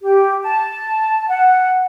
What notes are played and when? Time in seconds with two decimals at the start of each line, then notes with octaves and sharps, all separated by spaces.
0.02 G4
0.43 A5
1.28 F#5